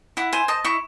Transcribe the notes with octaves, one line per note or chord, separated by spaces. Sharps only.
E4 F#5
C5 G#5
D#5 A5
E4 C#6